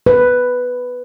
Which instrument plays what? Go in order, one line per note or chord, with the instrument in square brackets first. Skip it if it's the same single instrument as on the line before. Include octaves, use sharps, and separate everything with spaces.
[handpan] B4